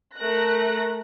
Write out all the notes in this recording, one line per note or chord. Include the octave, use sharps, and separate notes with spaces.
A3 A#4 F#6 A#6